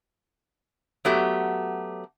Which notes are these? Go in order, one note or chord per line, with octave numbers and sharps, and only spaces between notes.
F#3 A3 B3 F#4 G4